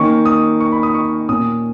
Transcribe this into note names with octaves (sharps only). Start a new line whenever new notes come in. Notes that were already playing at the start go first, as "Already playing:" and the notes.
Already playing: D#3 A#3 C#4 C#6
D#6
C#6
B5
D#6
C#6
A#2 A#3 C#4 D#6